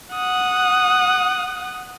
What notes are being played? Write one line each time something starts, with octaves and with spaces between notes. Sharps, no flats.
F#5 D#6